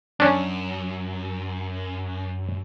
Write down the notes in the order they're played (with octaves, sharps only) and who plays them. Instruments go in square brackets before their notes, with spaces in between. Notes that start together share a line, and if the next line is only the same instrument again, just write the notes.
[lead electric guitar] F#2 [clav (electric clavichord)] C#4 D4